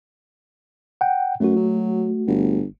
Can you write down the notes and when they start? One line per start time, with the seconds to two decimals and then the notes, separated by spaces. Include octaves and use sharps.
1.01 F#5 G5
1.40 F#2 A3 F#4
1.56 F#3
2.27 G1